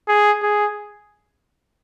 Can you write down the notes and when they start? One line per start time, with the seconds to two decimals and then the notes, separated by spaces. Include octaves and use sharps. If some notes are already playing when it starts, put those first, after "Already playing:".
0.08 G#4
0.42 G#4